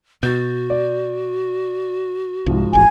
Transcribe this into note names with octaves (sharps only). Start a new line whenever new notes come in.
B2 F#4 G6 A6
D5
C2 G#2 F3
E1 A1 E2 G#5